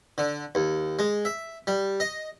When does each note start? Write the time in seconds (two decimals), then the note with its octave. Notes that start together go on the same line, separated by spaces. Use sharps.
0.18 D3
0.55 D#2
0.99 G#3
1.25 E5
1.67 G3
2.00 D#5